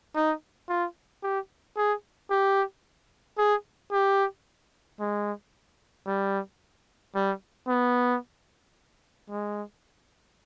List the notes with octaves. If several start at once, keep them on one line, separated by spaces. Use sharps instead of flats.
D#4
F4
G4
G#4
G4
G#4
G4
G#3
G3
G3
B3
G#3